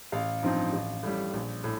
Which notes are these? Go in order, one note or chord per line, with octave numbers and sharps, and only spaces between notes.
A1 F5
G2 F3 C4 D#4
A1
A2 G3
A#1
A2